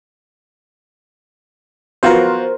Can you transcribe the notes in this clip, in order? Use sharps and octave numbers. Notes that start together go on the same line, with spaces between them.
B3 F4 F#4 A#4 C5